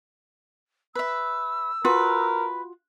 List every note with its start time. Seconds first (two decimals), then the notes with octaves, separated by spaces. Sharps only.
0.95 B4 E5 E6
1.85 F4 F#4 A#4 B4